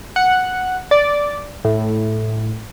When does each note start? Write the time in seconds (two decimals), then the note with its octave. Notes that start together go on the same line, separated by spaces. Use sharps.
0.16 F#5
0.91 D5
1.65 A2